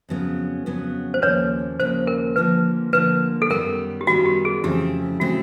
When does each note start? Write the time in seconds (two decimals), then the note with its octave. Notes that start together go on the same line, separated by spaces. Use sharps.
0.09 F2 C#3 F#3 B3
0.66 F2 C#3 F#3 B3
1.14 C5
1.22 D#2 C#3 F3 A#3 B4 C#5
1.80 D#2 C#3 F3 A#3 C5
2.07 A#4
2.36 D2 D3 F3 A#3 B4
2.93 D2 D3 F3 A#3 B4
3.42 A4
3.50 F#2 D#3 G3 B3 A#4
4.01 G4
4.07 F#2 D#3 G3 B3 F#4
4.26 G4
4.45 G#4
4.64 F2 C#3 E3 A3 C4 G4
5.20 C#3 E3 A3 C4 F#4